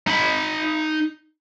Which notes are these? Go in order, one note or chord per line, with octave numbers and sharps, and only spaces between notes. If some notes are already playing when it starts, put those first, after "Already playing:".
D#4 B5